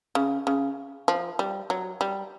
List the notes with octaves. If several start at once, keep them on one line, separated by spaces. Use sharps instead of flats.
C#3
C#3
F3
G3
F#3
G3